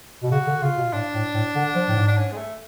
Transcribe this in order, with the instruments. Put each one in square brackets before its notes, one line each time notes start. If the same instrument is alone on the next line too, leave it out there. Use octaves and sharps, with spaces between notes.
[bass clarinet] B2
[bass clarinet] C#3 [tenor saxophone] F#4
[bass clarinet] D3
[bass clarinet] C#3 [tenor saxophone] F4
[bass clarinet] B2
[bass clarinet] A2 [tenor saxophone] D4
[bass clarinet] A2
A2
D3
F3
A2
G#2
[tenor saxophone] D4
C#4
G#3
A3